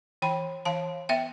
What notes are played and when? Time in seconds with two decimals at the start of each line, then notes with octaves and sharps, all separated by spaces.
0.22 E3 G5 B5
0.65 E3 F5 A5
1.09 B3 E5 G5